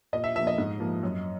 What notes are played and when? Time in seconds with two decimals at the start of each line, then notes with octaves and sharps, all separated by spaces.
0.13 A#2 D#5
0.24 E5
0.35 F3 E5
0.39 A#3
0.47 D#5
0.58 G#2
0.80 F3 A#3
1.03 F#2